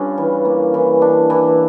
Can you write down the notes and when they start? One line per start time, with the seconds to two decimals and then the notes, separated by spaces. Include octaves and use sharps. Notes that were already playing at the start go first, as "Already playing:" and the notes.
Already playing: G2 C#4 F4
0.18 E3
0.45 A#3
0.74 E3
1.02 D4
1.30 E3